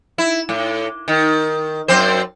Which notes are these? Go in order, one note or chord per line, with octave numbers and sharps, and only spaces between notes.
E4
A2
D#3
F#2 C4 C5